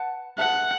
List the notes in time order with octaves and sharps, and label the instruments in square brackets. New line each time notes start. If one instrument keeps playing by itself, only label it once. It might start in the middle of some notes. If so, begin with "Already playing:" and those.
Already playing: [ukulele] B4 F#5 A5
[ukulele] G#4 B4 E5 A5 [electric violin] F#5